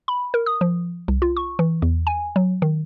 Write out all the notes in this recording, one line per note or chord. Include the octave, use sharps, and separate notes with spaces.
B5
A#4
D#6
F3
C2
F4
C#6
E3
E2
G#5
F#3
D#3